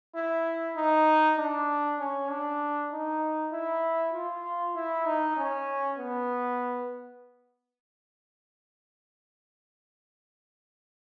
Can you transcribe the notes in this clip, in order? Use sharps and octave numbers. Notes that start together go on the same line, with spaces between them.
E4
D#4
D4
C#4
D4
D#4
E4
F4
E4
D#4
C#4
B3